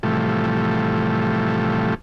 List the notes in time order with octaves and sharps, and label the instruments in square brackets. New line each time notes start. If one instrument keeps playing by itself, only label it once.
[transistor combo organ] A2 C3 E3 F3 G3 A3